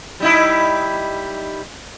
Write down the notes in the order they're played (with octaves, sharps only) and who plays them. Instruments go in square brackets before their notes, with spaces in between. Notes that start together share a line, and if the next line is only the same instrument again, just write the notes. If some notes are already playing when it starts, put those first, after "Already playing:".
[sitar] G3 D#4 E4